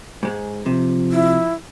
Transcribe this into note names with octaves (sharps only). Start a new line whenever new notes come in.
G#2 G#3
C3 F3
E4